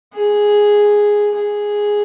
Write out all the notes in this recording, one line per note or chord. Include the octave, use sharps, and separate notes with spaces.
G#4
G#4